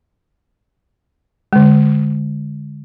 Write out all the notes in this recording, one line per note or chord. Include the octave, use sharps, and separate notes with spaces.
D3 G#3